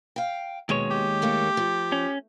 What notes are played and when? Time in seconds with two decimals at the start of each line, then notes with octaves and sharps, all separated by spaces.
0.16 F5 G5
0.69 D#2 B2 G#3 C#5
0.91 G4
1.22 A3 A#3 A4
1.57 F3
1.92 C#4